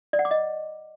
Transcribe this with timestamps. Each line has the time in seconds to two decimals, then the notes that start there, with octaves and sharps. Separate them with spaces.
0.13 D5
0.19 F#5
0.25 D6
0.31 D#5